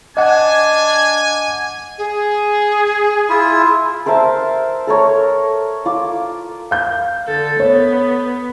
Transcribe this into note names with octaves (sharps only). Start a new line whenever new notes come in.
D4 D#5 F#5 G#5
G#4
E4 F4 E5
A#4 C5 E5 A5
A4 A#4 C#5
F4 D6
F5 G6
D3 A4
B3 C#5